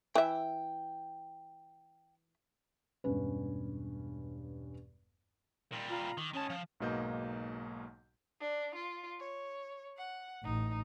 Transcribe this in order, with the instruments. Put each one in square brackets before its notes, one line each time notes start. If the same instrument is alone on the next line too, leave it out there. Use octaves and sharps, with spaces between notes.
[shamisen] E3 E5 [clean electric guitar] G5
[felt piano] E1 G2 C#4 B4
[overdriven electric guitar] A#2 G3
[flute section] F4 A#5 B5
[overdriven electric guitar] D#3 [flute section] D6
[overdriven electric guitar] D#3 A5 [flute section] C#4 D#6
[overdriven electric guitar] F3
[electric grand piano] B1 G#2 B2 A#3 D#5 G6
[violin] D4
F4
C#5
F#5
[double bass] A1 [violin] D#4